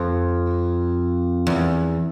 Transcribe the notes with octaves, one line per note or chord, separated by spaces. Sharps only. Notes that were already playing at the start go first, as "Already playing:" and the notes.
Already playing: F2
E2